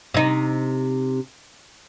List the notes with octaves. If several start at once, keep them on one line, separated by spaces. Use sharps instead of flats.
C3 D#4